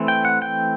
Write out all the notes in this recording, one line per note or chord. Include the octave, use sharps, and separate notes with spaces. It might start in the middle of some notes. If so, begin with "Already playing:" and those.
Already playing: E3 A3 C4
G5
F#5
G5